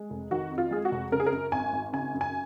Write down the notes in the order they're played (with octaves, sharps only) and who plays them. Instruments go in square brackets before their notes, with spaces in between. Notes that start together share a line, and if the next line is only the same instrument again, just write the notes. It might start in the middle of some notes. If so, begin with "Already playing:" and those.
Already playing: [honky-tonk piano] G#3
F1
D#3 F#4
F2
F4
G#3 G#4
F#4
F1
C#3 A#4
G#4
A#4
F#2
G#1 G#5
G#1
C#3 G#5
F#2
G#5